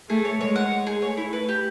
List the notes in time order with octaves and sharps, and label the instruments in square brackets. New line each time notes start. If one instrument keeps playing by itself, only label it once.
[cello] A3 [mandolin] G#4
[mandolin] C#5
[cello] G#3 [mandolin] C#5
[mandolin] F#5
C#5
G#4
[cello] A3 [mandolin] C#5
[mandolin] E4
B4
G4